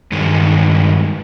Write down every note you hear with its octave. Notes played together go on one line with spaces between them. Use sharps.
G2 D#3 G#3